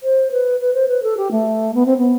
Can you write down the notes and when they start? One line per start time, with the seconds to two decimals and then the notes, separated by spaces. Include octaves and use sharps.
0.03 C5
0.31 B4
0.59 B4
0.74 C5
0.88 B4
1.03 A4
1.17 G4
1.31 A3
1.74 B3
1.85 C4
1.97 B3